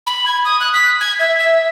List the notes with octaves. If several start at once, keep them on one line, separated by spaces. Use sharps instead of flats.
B5
G#6
D#6
F#6
B6
G#6
E5
E5